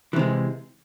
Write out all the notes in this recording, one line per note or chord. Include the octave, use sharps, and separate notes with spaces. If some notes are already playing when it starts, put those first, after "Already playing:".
C3 E3 G#3